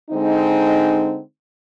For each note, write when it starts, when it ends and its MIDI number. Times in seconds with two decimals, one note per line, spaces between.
0.11 1.20 50
0.11 1.20 56
0.11 1.20 60
0.11 1.20 63